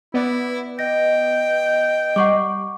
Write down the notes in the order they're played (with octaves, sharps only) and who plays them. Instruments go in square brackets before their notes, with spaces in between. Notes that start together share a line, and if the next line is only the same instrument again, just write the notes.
[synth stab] B3 D5 [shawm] E4
[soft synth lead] D#5 [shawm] G5 [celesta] A#6
[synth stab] G3 [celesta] F#5 C#6 D6